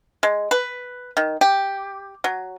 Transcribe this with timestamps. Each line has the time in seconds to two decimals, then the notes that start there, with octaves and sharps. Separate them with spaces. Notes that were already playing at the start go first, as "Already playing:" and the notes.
0.23 G#3
0.51 B4
1.17 D#3
1.41 G4
2.24 F#3